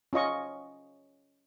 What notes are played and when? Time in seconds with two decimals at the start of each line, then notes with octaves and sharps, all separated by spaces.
0.13 C#4 F4 D#5 C#6